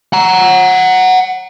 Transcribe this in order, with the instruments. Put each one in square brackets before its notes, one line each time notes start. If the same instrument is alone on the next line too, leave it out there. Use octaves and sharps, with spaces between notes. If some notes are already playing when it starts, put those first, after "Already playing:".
[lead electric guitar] F#5 A#5